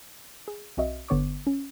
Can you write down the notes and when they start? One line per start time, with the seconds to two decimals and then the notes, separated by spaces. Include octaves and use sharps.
0.48 G#4
0.77 B1 C4 F#4 D#5 E5
1.08 G1 D3 B3 C#5 C#6 D6
1.47 C#4